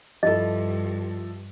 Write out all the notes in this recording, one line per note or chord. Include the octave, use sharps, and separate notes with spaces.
G2 F3 E4 A4 D#5